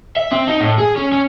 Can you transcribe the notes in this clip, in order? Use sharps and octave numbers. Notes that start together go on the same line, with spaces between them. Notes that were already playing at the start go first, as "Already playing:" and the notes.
E5
C4
D#4
A2
G#4
C#4
C#4